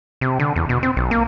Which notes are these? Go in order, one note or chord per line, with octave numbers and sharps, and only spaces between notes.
C3
D3
E2
B2
C4
B1
A#3